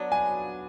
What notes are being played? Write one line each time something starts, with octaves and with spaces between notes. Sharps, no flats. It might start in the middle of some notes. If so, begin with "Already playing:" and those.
Already playing: F#3 B3 D4
G#5